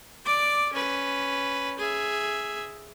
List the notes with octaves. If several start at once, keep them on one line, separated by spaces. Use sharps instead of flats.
D5 D6
C#4 B4
G#4 E5